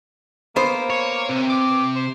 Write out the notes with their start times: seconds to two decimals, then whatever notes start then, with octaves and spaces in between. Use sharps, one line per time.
0.56 A#3 B3 C5
0.90 C#5
1.29 C3
1.50 D6
1.96 C5